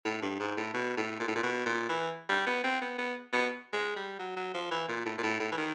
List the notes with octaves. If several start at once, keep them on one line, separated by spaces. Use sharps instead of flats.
A2
G2
G#2
A2
B2
A2
A#2
A2
A#2
B2
A#2
E3
G3
B3
C4
B3
B3
B3
G#3
G3
F#3
F#3
F3
E3
A#2
A2
A#2
A2
A2
E3
D#3